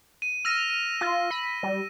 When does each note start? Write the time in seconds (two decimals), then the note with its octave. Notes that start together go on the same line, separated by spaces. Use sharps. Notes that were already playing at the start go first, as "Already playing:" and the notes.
0.22 D#7
0.45 E6 F6 A#6 D#7
0.70 D#7
1.01 F4 A#6
1.31 B5
1.63 G3